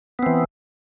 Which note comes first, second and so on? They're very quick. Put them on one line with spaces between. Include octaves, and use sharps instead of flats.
B3 C4 E3